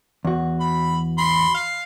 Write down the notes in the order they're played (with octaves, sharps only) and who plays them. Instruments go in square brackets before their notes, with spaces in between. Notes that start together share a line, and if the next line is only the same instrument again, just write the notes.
[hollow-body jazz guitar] E2 F#4
[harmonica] B5
B5 C6
F5